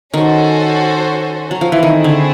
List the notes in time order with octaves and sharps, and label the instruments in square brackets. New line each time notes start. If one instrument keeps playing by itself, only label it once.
[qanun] D#3 [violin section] C#4 F#4 A4 C5
[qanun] F#3
F3
E3
[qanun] D#3 [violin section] A3 C4 E4 G#4
[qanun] D3